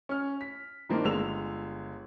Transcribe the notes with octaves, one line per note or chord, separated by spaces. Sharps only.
C#4 F6
B6
G2 D#3 A#3 C4 D4 D#4
G1 G#3 E6 F7